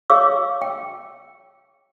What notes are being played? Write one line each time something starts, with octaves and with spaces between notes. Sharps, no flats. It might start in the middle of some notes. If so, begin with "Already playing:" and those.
G#4 C#5 F5 C#6 D6 E6
G5